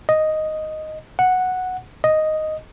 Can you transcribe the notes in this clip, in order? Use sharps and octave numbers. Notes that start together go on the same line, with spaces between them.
D#5
F#5
D#5